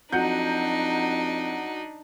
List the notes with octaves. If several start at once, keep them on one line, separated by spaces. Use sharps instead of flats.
F2 F#3 D4 D#4 F#5 G6